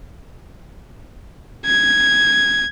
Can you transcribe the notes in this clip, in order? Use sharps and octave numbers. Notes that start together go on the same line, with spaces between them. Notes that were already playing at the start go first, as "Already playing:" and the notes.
G#6